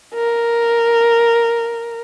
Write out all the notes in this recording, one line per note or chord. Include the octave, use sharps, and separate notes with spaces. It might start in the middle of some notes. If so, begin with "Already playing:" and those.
A#4